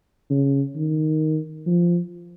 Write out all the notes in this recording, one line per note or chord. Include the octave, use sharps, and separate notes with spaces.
C#3
D#3
F3